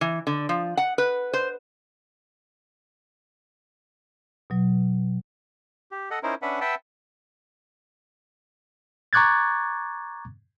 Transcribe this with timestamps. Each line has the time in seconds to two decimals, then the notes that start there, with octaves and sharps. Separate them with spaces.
0.01 E3
0.27 D3
0.49 F3
0.77 F#5
0.98 B4
1.34 C5
4.50 B2 F#3
5.91 G4
6.11 A4 D#5 F#5
6.23 C#4 D#4 E4 A#4 C5
6.42 C#4 D4 B4 E5 F#5
6.61 B4 E5 F#5 G5 A5 E6
9.13 A#5 C#6 D6 F#6 G#6 A6